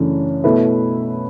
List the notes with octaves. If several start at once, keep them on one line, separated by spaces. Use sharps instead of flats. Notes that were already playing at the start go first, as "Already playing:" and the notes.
Already playing: F#2 C#3 E3 A3 D4
B2 A3 E4 B4